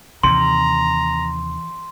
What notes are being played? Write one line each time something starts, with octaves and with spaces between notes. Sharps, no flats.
D#2 C3 E3 A#5 C6